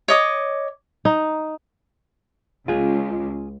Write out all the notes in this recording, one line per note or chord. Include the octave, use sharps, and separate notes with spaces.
C#5 D#5 D6
D#4
C#2 F4 G#4